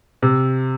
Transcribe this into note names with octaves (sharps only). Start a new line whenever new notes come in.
C3